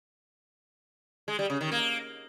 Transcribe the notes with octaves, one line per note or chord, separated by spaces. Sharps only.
G#3
G3
C#3
D#3
A#3